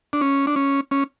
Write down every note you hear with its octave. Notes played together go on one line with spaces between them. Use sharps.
D4
C#4
D4
C#4
C#4